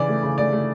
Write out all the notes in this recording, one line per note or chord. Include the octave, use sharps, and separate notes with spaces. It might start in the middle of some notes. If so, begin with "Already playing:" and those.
Already playing: C#3 E3 D5
A3
C#3
A3 D5
A3